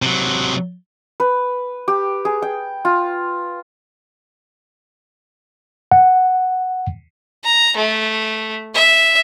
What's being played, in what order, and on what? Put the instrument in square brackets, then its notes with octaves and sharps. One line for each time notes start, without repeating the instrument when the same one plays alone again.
[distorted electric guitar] C3 F#3
[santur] B4
G4
G#4
G5
F4
[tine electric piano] F#5
[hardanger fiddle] A#5
A3
E5